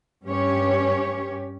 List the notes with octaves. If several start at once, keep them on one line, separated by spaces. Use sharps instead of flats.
G2 C#4 G4 C#5